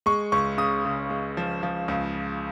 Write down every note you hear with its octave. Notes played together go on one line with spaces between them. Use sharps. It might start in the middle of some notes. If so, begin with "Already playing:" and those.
G#3 C#6
C#2 C#6
C#3 D#6
C#3
G#3
F3
F3
C#2